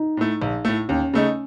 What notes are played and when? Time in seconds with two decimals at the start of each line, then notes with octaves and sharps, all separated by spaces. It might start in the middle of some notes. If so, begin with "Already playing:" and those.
Already playing: D#4
0.17 A2 A3
0.42 A#1
0.65 A2 A3
0.88 D#2 C#4
1.13 C#3 A3 D#4